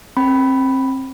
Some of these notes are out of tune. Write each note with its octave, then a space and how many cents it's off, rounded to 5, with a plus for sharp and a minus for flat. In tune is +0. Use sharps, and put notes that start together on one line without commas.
C4 +30 G5 -20 B5 +0